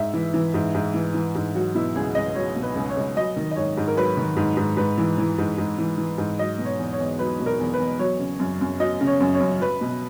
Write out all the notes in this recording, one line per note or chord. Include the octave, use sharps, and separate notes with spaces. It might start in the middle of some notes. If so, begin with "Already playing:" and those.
Already playing: G#2 E5
E3
E3
G#2
G#2
E3
E3
G#2
F#3 F#4
B2 E4
C#2 G#4
C#2 D#5
F#3 C#5
B2
B4
C#2
C#5
C#2
F#3 D#5
D#3
D#5
G#2 C#5
G#2
A#4
F#3 B4
D#3
G#2
G#2
G#2 B4
E3
E3
G#2
G#2
E3
E3
G#2
F#3 D#5
B2
C#5
E2
C#5
E2
F#3 B4
B2
A#4
E2
B4
E2
F#3 C#5
C#3
F#2
F#2
F#3 D#5
C#3
C#5
F#2
C#5
F#2
F#3 B4
B2